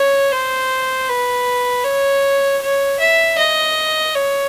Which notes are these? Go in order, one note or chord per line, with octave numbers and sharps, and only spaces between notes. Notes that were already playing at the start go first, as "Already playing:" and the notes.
Already playing: C#5
C5
B4
C#5
C#5
E5
D#5
C#5